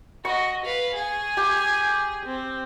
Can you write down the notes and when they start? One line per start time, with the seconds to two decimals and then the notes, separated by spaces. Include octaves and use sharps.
0.25 F#4 D#5 C#6
0.65 B4 F5
0.95 G#4 G#5
1.37 G4
2.25 C4